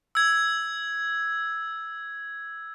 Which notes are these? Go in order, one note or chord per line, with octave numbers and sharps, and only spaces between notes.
E6 G#6